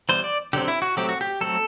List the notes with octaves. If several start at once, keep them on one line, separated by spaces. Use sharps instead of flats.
E3 G3 B3 C5
D5
D3 F#3 C4 G4
E4
F#4
F#3 A3 C4 G4
F#4
G4
F#3 A3 C4 A4